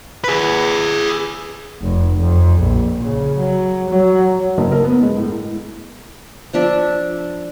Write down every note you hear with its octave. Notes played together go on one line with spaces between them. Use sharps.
G#4 B4
F1
F2
A#1
C#3
F#3
F#3
F#1
A#4
B3
G#3
A2
F3 D4 E5